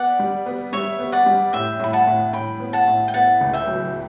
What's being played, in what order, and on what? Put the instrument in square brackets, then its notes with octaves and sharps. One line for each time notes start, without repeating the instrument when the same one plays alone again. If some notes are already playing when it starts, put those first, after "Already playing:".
Already playing: [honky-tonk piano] B3 [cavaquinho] D5 F#5
[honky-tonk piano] G3
B3
[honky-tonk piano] G3 [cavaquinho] C#5 E5
[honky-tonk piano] B3
[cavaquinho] D5 F#5
[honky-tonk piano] G3
[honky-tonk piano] A2 [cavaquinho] E5 G5
[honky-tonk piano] A2 [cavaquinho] B5
[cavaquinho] F#5 A5
[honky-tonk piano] A2
[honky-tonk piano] A2 [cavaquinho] G5 B5
[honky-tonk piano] B3
[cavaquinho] F#5 A5
[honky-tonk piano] A2
[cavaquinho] G5
[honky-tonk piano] B3 [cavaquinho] F#5 A5
[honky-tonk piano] C#2
[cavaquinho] E5 G5
[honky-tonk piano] F#3